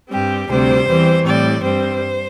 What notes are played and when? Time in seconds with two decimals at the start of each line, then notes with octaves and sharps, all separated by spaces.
0.10 G2 G3 C4 G4
0.48 D2 C3 G3 C4 C5
0.87 E2 E3 G3 C4
1.24 A2 G3 C4 D5
1.62 G2 G3 C4 C5